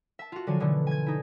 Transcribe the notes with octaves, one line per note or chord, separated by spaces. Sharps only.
E5 A5
F4 F#4
D3 F3 F#3 G#5
B2 D3 E3 F3 A3
G#5 G#6
D#4 E4